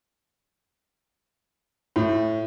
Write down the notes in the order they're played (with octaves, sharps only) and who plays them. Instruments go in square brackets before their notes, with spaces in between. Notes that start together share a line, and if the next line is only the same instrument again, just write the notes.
[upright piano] A2